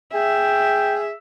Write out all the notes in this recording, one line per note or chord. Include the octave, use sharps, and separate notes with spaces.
G#4 E5 G5